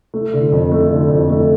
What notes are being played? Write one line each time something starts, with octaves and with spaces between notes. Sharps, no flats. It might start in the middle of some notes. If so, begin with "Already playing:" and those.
A3
D3
F2
A3
D3
F2
A3